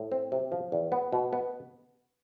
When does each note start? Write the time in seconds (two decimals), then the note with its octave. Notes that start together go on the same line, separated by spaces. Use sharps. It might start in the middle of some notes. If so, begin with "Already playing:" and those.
Already playing: A2
0.12 C4
0.32 C3
0.52 F3
0.72 E2
0.92 B3
1.13 B2
1.33 B3